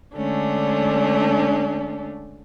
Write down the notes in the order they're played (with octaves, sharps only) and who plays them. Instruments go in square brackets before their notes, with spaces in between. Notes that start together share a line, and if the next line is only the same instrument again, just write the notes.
[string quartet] D3 G#3 A3 C#4 D4